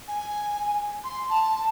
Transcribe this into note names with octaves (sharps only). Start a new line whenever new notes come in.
G#5
C6
A5